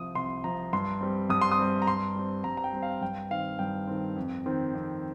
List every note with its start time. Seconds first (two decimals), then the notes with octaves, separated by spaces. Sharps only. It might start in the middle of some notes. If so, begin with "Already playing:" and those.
Already playing: C2 C3 F3 D#6
0.15 C2 C6
0.44 C3 F3 A#5
0.73 G2 C6
1.01 G3 C4
1.30 G2 D#6
1.41 C6
1.51 D#6
1.58 G3 C4
1.82 A#5
1.87 G2 C6
2.16 G3 C4
2.44 G2 A#5
2.57 A#5
2.64 G5
2.73 G3 C4
2.83 F5
3.01 G2 G5
3.31 D#3 C4 F5
3.59 G2 G5
3.87 D#3 C4
4.16 F2
4.46 D#3 C4
4.74 F2